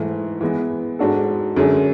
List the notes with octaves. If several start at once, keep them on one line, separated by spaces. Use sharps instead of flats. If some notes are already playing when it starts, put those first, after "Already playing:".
Already playing: G#2 E3 A3
E3 G#3 B3
G#2 G#3 D4 F#4 A4
F#2 D3 G#3 C#4 G#4